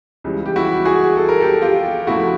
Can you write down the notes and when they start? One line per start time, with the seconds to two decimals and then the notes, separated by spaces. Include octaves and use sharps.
0.24 C#2 C#3 E3 G3
0.46 G4
0.56 E4 F#4
0.85 F#4 G#4
1.17 A4
1.29 A#4
1.41 G4 A4
1.62 F4 G4
2.07 F2 C#3 F3 A3 E4 F#4